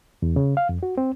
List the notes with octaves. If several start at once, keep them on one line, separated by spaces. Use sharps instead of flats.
E2
C#3
F5
F2
F#4
C4